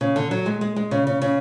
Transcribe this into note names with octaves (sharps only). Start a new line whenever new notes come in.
C#3
D3
F#3
G#3
G#3
G#3
C#3
C#3
C#3